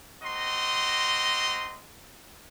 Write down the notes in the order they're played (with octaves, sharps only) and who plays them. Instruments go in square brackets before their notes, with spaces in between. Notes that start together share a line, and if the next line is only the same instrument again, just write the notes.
[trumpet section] C4 F#4 D#5 A#5 C6